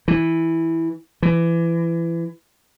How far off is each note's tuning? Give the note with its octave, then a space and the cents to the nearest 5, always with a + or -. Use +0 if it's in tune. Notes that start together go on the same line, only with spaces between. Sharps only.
E3 -5
E3 +25